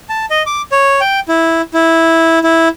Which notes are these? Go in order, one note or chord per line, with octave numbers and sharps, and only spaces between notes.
A5
D#5
D6
C#5
G5
E4
E4
E4